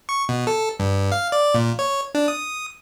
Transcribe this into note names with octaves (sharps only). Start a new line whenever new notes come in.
C#6
B2
A4
G2
F5
D5
A#2
C#5
D4
D#6